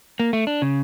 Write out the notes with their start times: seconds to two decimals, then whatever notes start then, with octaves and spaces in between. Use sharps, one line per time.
0.20 A#3
0.33 A3
0.47 D4
0.62 C#3